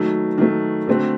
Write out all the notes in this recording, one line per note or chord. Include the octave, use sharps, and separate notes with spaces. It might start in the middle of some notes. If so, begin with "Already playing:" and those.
Already playing: D#3 F#3 A3
D#3 F#3 A3
D3 A3 C4 F#4